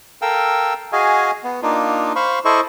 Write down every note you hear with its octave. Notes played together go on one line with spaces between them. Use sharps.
A4 A#4 F5 G5 E6
F#4 G#4 D#5 F5 G#5
B3
A#3 D4 D#4 F4
C5 F5 B5 C#6
E4 A4 C5 D#5 C#6